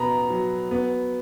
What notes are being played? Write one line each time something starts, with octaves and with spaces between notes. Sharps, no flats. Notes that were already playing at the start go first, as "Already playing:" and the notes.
Already playing: B2 B3 A#5 B5
F#3
B3